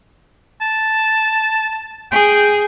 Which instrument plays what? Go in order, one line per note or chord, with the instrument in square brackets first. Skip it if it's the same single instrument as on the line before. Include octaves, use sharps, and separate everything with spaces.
[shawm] A5
[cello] G#4 [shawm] G5